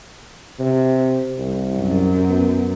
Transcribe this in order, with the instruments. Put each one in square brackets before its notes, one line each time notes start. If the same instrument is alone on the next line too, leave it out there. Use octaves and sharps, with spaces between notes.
[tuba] C3
C2
[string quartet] F#2
[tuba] B3